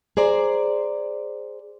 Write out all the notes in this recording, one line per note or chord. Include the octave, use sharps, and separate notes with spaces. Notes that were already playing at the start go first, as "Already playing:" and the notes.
G#4 C5 D5 A#5